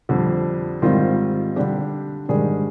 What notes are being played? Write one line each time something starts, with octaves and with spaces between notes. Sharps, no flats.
F2 D3 G3
G#2 D#3 G3 C4 F4
D3 G3 D4 G4
G#2 D#3 G3 D4 G#4